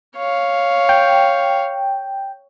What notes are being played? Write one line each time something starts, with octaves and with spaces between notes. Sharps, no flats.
C#5 F5
G5